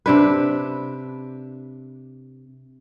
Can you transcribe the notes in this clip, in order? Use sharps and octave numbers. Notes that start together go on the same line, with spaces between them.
C3 D4 B4